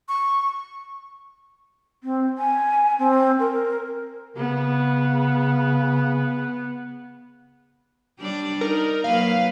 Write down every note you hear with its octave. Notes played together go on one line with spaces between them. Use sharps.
C#6
C4
G#5
C4
A#4
C#3 B3
G3 D4 D5
D#4 A#4
F#3 A#3 B4 F5